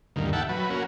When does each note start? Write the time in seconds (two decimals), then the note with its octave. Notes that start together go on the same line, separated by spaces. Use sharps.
0.16 D2 G2 A#2 D#3
0.33 E5 F#5 G5 A5
0.49 F#3 B4
0.70 A#3 C#4 F#4